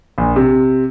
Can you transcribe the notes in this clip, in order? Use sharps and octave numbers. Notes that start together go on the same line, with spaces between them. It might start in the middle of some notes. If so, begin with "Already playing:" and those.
A#1
C3